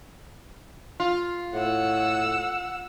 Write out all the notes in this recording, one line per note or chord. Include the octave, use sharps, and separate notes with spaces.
F4
A2 F#5 E6